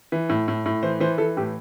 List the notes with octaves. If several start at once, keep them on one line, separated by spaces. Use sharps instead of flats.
E3
A2
A2
A2
E3 C5
E3 C5
E3 A4
A2 G4